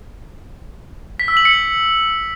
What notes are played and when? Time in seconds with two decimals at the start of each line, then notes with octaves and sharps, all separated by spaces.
1.20 B6
1.28 E6
1.37 F#7
1.45 C#7